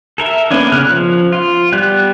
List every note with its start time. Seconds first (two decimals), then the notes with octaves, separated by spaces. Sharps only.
0.18 A4 A#4 E5
0.50 A#3 B3 C#4 D4
0.72 C#3 F6 F#6
0.87 F3
1.32 F4
1.72 G3 B3 F#6